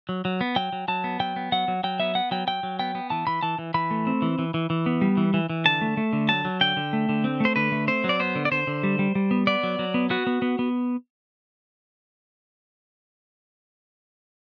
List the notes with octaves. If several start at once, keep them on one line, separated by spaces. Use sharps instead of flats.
F#3
F#3
B3
F#3 G5
F#3
F#3 A5
B3
F#3 G5
B3
F#3 F#5
F#3
F#3 G5
B3 E5
B3 F#5
F#3 G5
F#3 G5
F#3
B3 G5
B3
E3 A5
E3 B5
E3 A5
E3
E3 B5
A3
C4
E3
E3
E3
E3
B3
G3
E3
E3
E3
D3 A5
A3
A3
D3
F#3 A5
F#3
D3 G5
D3
A3
D3
C4
A3 C5
D3 B4
A3
C4 C5
F#3
D5
B3 C5
D3
D5
D3 C5
D3
G3
G3
G3
B3
B3 D5
F#3
F#3
B3
B3 F#4
B3
B3
B3